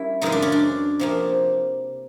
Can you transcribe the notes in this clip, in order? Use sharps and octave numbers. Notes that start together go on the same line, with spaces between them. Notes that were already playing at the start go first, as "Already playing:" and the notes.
Already playing: G3 A#3 C#4 E4
F#2 C#3 E3 G#3 D#4
D4
C#4
D4
C3 F3 A#3